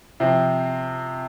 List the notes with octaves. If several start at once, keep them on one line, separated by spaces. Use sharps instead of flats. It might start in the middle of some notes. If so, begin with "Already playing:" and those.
C3 F3 C4